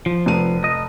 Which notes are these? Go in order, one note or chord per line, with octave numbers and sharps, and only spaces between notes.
F3
F1 D#7
D#5